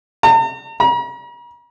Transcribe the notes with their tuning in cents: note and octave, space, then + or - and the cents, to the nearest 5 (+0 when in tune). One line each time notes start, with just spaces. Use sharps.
A#5 -45
A#5 +45